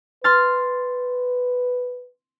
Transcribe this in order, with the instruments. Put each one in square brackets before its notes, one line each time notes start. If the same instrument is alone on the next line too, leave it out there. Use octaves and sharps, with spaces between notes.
[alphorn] B4 [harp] C6 F6 A6